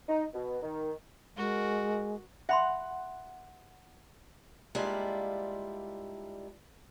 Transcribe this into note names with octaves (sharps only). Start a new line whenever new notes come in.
D#4
B2
D#3
G#3 F#4 A#4
E5 F#5 B5 C6
G3 G#3 A#3 D4 E4 F4